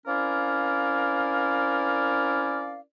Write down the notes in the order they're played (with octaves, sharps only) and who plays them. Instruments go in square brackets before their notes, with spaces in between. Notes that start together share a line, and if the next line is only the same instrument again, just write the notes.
[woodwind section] C4 C#4 E4 A#4 D5 F5